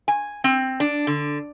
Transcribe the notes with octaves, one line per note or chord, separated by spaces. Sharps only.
G#5
C4
D4
D3